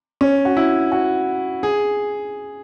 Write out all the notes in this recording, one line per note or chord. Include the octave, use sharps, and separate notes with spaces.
C#4
F#4
E4
F#4
G#4